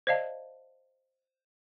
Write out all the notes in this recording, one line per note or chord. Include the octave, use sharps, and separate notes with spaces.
C5 D5 D#5 F5 A5